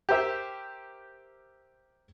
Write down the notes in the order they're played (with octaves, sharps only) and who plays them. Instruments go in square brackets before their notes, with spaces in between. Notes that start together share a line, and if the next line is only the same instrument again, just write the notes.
[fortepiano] G4 A#4 C5 E5 G5